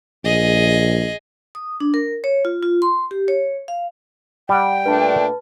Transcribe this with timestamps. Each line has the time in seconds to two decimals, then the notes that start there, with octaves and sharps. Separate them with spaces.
0.25 A#1 G#4 D#5
1.55 D#6
1.80 D4
1.94 A#4
2.24 C#5
2.45 F4
2.63 F4
2.82 C6
3.11 G4
3.28 C#5
3.68 F5
4.49 G3 F#5 G5
4.86 A#2 A3 D4 B4 A5